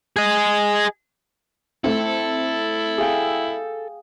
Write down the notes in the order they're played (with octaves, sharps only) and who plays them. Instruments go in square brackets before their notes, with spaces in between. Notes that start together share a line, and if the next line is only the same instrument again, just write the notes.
[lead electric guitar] G#4 D#5
[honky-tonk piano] A3 C4 [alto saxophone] E4 [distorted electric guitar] A4
[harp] G#4 F5 G5